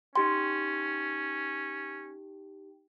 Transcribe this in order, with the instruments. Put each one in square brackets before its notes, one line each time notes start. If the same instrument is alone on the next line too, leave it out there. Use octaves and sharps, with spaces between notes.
[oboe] C#4 [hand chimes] D#4 G4 G5 [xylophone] C6